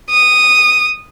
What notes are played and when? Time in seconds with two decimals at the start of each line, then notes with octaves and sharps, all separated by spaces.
0.11 D#6